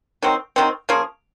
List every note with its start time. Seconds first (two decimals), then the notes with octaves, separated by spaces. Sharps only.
0.22 D#3 F#3 C4
0.56 D#3 F#3 C4
0.89 F3 A#3 C#4 G#4